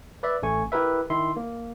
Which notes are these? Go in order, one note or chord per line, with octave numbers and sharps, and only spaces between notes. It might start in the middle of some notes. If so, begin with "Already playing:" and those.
B4 D5 E5
A1 A3 G#5 C#6
E4 G4 A#4 B4 E5
D#3 E4 E5 C6
A#3